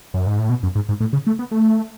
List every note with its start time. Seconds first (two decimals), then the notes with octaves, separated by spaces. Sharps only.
0.14 F#2
0.27 G#2
0.39 A2
0.49 B2
0.63 F#2
0.75 G#2
0.89 G#2
1.00 A2
1.13 C#3
1.27 A3
1.39 B3
1.51 A3